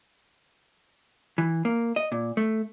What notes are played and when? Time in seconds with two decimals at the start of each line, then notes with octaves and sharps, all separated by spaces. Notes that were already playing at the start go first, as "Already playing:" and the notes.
1.38 E3
1.65 A#3
1.96 D#5
2.12 A#2
2.37 A3